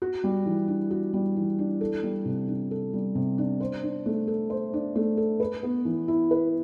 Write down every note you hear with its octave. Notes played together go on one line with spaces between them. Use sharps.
F#4
G3
E3
D4
F#4
G3
E3
D4
A4
G3
C3
D4
A4
G3
C3
D4
C5
D4
A3
A4
C5
D4
A3
A4
B4
B3
E3
E4
B4